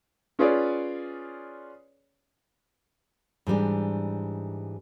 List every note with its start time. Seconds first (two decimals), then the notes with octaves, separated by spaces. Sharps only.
0.39 C#4 F4 G#4 B4 C#5 D5
3.47 G#2 E3 G3 D4